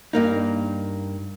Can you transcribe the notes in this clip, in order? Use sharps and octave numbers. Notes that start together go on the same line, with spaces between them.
G2 A#3 D#4